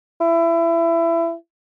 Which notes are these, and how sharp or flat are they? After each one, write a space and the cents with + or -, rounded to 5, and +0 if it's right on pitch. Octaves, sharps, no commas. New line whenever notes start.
E4 +25